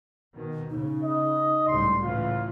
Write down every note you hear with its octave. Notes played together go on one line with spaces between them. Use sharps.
B2 D#3
C#3 D#4
D#5
C#2 A2 G3 C6
A2 C#3 E3 F4